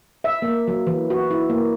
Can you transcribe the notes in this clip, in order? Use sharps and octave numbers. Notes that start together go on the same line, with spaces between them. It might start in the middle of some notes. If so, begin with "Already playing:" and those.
E5
A#3
F#3
E3
F#4
E4
A#3